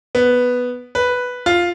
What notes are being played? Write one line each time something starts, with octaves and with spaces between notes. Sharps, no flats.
B3
B4
F4